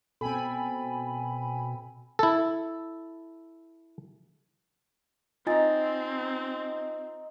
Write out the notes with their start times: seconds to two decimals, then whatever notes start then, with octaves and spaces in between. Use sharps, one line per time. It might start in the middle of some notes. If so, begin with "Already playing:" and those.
0.21 B2 C4 A4 G5 G#5 B5
2.19 E4 A4
5.47 C4 D#4 F4 G#5 A#5 A6